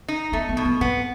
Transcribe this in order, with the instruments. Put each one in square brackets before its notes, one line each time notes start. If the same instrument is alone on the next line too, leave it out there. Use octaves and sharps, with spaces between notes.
[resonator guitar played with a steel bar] D#4
[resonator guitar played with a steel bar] A3 [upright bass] B3
[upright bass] B3
[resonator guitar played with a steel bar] B2
[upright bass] B3
[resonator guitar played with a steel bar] B3 [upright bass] C4